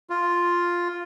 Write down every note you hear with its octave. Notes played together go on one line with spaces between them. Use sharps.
F4